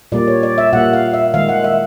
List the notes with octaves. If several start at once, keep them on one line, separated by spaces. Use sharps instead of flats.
A#2 G3 A#3 D5
C#5
D5
E5
A#2 G3 A#3 F#5
F5
E5
D#3 G#3 F5
F#5
E5